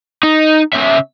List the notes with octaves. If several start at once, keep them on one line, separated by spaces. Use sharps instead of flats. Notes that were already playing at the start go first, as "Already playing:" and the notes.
D#4
C#3 E5